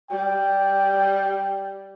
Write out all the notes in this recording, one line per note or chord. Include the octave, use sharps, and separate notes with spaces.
G3 G5